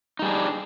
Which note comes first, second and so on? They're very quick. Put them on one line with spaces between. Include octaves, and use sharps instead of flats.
D#4 G3 G#4 D4